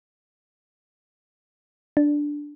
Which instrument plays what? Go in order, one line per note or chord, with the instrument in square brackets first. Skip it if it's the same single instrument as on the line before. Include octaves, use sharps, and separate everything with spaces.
[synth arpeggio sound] D4